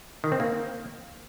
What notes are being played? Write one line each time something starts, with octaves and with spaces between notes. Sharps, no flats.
D#3
C4
A#3